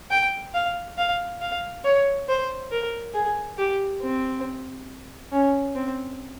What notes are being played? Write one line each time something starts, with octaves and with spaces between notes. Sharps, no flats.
G5
F5
F5
F5
C#5
C5
A#4
G#4
G4
C4
C#4
C4